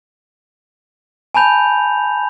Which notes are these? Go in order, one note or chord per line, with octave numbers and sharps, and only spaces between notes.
G#5 A5 B5 G6 F7